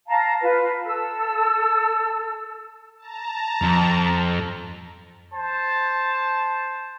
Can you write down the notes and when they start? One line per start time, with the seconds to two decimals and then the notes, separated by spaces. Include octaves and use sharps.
0.08 F5 A5 A#5
0.42 F4 B4
0.86 A4 E6
2.98 A5 A#5
3.62 F2
5.33 C5 A5